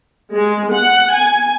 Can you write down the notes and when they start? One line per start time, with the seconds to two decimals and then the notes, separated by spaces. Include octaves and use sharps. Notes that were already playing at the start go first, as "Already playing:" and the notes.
0.34 G#3
0.69 F#5
1.12 G#5